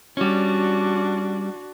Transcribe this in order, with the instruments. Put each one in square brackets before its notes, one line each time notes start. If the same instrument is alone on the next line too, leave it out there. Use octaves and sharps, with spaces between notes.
[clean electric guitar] G3 C#4 [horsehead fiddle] D4 F#4